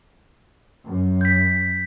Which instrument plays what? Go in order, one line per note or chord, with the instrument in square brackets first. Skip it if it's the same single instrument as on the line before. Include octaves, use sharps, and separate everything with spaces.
[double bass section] F#2
[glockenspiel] G6 B6